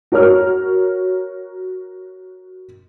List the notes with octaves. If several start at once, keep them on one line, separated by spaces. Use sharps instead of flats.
F#4 A#4 C#5 F6